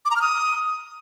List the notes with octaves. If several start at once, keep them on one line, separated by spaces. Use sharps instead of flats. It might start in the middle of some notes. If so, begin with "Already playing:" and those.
D6
A#5
F6
D#6